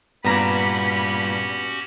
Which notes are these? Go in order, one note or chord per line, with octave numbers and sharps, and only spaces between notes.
G2 A#2 B3 C#4 F#4 G4 A#5 B5